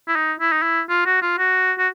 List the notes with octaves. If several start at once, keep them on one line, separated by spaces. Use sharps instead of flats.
E4
D#4
E4
D#4
E4
F4
F#4
F4
F#4
F#4